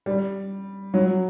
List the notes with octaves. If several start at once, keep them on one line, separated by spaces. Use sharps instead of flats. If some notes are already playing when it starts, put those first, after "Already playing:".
G3
F#3